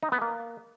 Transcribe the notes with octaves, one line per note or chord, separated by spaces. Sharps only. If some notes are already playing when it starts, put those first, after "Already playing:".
D#4
B3
A#3